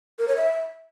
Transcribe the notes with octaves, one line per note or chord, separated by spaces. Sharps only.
A#4
C#5
E5